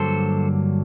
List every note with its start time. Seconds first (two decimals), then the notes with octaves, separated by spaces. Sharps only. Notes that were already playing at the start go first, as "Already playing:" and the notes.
Already playing: G2 D3 F#3 A#3 A4 C5